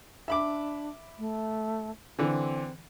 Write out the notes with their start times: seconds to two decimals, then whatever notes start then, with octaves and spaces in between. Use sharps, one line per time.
0.28 D4 E5 B5 D6
1.18 A3
2.19 D3 E3 C4